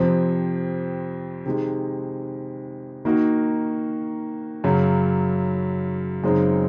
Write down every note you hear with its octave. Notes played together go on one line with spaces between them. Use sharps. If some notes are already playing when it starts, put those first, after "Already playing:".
Already playing: F2 C3 F3 C4
C3 D#3 G#3
D#3 A#3 D#4 F#4
F#2 C#3 F#3
F#2 C#3 G#3 C4 D#4